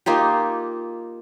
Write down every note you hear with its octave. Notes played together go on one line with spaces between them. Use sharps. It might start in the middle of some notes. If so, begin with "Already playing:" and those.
A#3 D#4 F4 G4